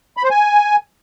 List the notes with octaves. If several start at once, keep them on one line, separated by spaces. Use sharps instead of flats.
B5
C5
G#5